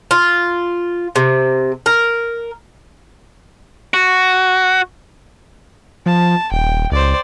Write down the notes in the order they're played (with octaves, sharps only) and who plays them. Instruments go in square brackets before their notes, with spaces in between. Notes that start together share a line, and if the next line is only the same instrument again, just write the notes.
[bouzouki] F4
C3
A#4
[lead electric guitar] F#4
[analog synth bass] F3 [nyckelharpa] A5
[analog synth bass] D#1 [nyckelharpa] G5
[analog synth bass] C#2 [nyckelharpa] C5 D5